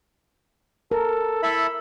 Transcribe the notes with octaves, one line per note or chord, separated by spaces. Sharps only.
A4 A#4
E4 A4 E5 B5